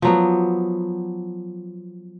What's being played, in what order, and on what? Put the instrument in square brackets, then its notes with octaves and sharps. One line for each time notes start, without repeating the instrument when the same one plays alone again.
[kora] F3 F#3 B3